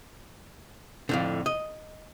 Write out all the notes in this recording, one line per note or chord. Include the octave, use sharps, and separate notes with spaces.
F2 A2 D3
D#5